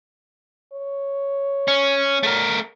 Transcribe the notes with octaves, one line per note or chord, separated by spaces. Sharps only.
C#5
C#4
A3 A#4